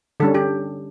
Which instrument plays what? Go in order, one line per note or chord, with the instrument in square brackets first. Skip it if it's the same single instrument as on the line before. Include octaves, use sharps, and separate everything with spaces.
[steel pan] D3 G3 C#4 A4
G4